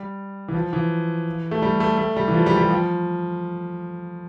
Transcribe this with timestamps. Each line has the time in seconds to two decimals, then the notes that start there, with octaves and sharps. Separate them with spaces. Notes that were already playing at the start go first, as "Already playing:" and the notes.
Already playing: G3
0.48 E3
0.54 F3
0.73 E3
1.51 A3
1.62 G3
1.80 A3
1.98 A3
2.16 G3
2.28 E3
2.34 F3
2.46 G3
2.57 G3
2.71 F3